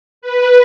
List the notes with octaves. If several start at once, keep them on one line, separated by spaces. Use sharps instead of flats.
B4